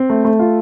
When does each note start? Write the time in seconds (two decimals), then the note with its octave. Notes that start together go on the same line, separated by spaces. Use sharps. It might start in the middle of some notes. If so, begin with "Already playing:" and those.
Already playing: C4
0.10 A3
0.25 A3
0.39 F4